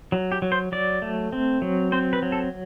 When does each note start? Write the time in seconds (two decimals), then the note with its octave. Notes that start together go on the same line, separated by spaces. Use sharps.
0.12 F#3
0.32 G4
0.42 F#3
0.52 C5
0.72 F#3 D5
1.02 A3
1.32 C4
1.62 F#3
1.92 C4 C5
2.13 B4
2.22 F#3
2.32 A4